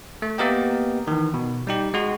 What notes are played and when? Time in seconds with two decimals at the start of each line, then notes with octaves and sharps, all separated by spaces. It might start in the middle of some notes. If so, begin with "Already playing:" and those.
0.22 A3
0.38 A#3 B3 G4 A#4 D#5 G5
1.07 D#3 E3
1.34 B2
1.67 G3 D#4 G4
1.94 G#3 F#4